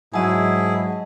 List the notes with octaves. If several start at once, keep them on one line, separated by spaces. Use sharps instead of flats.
G#2 F#3 E4 G#4 D#5 G#5 A5